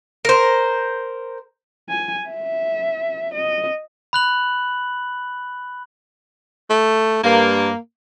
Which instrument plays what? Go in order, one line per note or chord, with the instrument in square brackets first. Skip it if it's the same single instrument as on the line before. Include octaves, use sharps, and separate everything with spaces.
[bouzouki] A#4 C5
[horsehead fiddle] G#5
E5
D#5
[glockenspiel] B5 F#6 F#7
[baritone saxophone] A3
[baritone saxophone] G2 [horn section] A#3